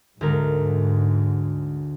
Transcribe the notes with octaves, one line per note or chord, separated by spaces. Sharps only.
D2 G#2 A#4